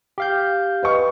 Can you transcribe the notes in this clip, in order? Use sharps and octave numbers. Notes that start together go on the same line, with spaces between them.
G4 F5 G6
B4 D#5 C#6